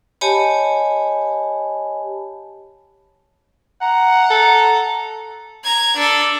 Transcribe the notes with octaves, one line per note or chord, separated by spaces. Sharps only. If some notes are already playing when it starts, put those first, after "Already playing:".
G4 C#5 D#5 G#5 A5 B5
F#5 A#5
A4
A#5 G#6
D4 A4